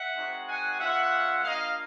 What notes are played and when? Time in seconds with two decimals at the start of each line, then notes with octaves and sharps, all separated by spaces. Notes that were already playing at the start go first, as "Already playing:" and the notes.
Already playing: E5 F#5
0.16 G#3 C4 D#4 F#4
0.47 F#5 G#5
0.79 G#3 C#4 F4 E5 F#5
1.44 A#3 D4 F4 D#5 F5